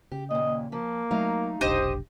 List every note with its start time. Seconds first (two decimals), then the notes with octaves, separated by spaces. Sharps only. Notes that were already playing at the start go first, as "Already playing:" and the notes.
0.11 C#3 G4
0.31 D#2 A#2 D#5
0.72 F3 A#3
1.11 F#3 A3 D#4 F5
1.61 F1 B1 D4 G4 C5 D#5